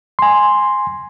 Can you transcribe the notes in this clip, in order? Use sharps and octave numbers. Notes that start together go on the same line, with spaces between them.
G#5 C6